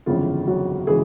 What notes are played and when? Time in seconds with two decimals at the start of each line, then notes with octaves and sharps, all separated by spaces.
0.06 G1 F2 C#3 E3 G#3 F4
0.47 F#3 F#4
0.87 C#3 E3 G#3 G#4